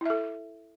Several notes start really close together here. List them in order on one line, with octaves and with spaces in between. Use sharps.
E4 E5 A4